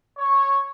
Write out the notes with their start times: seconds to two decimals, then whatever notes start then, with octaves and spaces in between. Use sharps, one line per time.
0.18 C#5